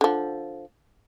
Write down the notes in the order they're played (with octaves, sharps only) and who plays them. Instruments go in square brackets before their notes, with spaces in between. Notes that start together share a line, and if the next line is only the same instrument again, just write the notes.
[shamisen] D3 F3